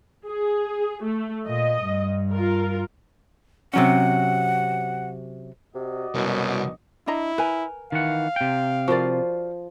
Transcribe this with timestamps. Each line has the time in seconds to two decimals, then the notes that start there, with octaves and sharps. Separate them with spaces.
0.27 G#4
1.03 A3
1.47 A#2 D#5
1.82 G2
2.32 F4 A#4
3.74 C3 F#3 C#4 F#5
5.75 C3 F#4 D5 D#5
6.14 C2 F#2 B2
7.07 D4 E4 D#5 A#5
7.38 A#4 B4 G#5
7.92 D#3 E3 F5 F#5
8.36 C3 G5
8.88 F3 F#4 A#4 C5 D5